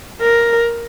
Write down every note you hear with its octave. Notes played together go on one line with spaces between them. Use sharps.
A#4